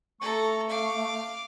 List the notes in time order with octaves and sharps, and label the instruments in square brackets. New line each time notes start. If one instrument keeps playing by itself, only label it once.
[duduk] A3 [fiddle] A4 A#5 [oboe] C#6
[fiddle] F5 D6